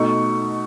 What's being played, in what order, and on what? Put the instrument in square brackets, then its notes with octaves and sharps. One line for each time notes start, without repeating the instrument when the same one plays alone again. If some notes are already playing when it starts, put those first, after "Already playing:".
Already playing: [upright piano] B2 A3 D#4 C#6